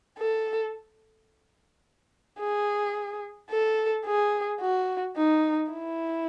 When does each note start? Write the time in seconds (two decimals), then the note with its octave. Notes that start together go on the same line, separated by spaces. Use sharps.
0.19 A4
2.40 G#4
3.51 A4
4.06 G#4
4.61 F#4
5.17 D#4
5.72 E4